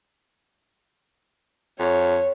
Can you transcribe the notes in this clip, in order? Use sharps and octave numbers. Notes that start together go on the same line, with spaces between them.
F2 C#5